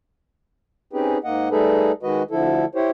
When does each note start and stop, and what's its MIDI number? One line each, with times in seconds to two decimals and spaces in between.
0.93 1.18 60
0.93 1.18 61
0.93 1.18 63
0.93 1.18 67
0.93 1.18 68
0.93 1.18 71
1.24 1.49 44
1.24 1.49 58
1.24 1.49 75
1.24 1.49 78
1.51 1.92 55
1.51 1.92 57
1.51 1.92 63
1.51 1.92 68
1.51 1.92 69
1.51 1.92 71
2.03 2.23 51
2.03 2.23 56
2.03 2.23 66
2.03 2.23 71
2.03 2.23 75
2.31 2.65 38
2.31 2.65 50
2.31 2.65 53
2.31 2.65 64
2.31 2.65 69
2.75 2.91 64
2.75 2.91 67
2.75 2.91 72
2.75 2.91 73